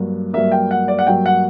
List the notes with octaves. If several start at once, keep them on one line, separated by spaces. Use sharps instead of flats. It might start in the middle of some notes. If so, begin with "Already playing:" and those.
Already playing: G2 F#3 A#3
G2 F#3 A#3 E5
G5
F#5
D5
F#5
G2 F#3 A#3 G5
F#5